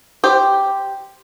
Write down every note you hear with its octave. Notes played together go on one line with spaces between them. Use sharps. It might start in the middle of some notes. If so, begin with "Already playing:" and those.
G4 C5